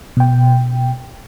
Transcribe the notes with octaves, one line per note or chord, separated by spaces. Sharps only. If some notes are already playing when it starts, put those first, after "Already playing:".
B2 G5